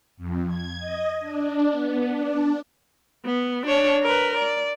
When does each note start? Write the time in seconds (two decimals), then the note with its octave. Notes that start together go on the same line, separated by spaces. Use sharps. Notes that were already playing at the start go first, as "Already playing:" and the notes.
0.17 F2
0.47 G#6
0.78 D#5
1.20 D4
1.71 B3
2.09 D4
3.25 B3
3.66 D4 C#5
4.03 A#4 B4
4.37 D5